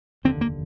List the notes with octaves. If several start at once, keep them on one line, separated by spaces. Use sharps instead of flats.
F1 D#2 D3 C4
A#3